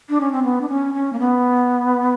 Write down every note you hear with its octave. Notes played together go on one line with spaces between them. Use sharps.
D4
C#4
C4
B3
D4
C#4
C#4
A#3
B3